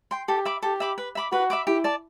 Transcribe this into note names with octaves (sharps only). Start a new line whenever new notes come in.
G5 C6
G4 A4
E5 B5 D6
G4 A4
E5 B5 D6
B4
E5 B5 D6
F#4 B4
E5 B5 D6
E4 G4
D5 A5